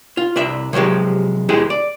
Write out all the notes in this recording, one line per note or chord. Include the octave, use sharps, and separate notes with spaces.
F4
C2 D4 E5
C3 F3 F#3 G#3 G4
E2 G#3 E4 G4 G#4
D5